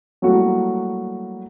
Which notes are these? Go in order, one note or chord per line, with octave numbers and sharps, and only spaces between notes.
F#3 G3 A3 A#3 E4 F#4